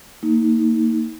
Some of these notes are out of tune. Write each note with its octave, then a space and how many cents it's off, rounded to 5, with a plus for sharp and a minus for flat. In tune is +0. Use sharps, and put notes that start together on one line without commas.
A#3 -20 D#4 +25